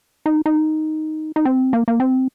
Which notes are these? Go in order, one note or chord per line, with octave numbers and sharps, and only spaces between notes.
D#4
D#4
D#4
C4
A#3
A#3
C4